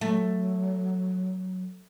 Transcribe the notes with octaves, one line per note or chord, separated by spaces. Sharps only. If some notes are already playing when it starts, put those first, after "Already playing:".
F#3 A3